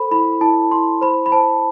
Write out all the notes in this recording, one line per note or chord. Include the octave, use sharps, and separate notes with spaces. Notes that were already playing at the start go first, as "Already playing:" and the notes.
Already playing: A4 C5 B5
E4 B5
E4 A5
E4 C6
C5 B5
B5
C5 A5